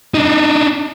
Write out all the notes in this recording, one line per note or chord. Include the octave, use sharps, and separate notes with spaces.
D4 D#4